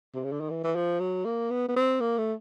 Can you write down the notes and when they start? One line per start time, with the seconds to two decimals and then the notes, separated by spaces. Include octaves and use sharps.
0.15 C3
0.24 C#3
0.32 D3
0.41 D#3
0.50 E3
0.64 E3
0.76 F3
1.00 F#3
1.25 A#3
1.50 B3
1.68 B3
1.76 C4
2.00 A#3
2.18 A3